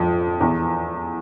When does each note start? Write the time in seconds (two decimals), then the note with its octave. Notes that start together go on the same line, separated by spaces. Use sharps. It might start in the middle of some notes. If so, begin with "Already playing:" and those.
Already playing: F2
0.41 E2